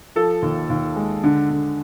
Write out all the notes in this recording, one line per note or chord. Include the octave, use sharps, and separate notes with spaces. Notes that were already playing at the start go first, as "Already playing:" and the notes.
F3 A4
D#2
D#2
G#3
D3
D3